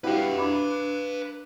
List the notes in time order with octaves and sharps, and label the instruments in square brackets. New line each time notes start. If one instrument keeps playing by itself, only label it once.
[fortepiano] E4 F#4 G4 [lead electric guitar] B4 F5
[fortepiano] D4 B5 D6